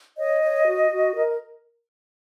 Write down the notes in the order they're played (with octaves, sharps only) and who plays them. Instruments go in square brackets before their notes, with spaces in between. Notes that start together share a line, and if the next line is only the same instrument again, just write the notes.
[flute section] C#5 D#5
C#5
F#4
F#4
A#4